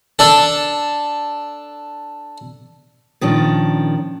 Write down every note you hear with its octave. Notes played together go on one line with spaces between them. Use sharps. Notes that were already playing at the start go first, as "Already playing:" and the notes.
D4 A4
A#2 D#3 F3 C#4 D4